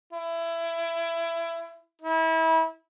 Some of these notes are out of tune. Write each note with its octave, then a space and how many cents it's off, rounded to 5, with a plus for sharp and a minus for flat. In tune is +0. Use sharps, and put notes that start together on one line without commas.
E4 +20
E4 -30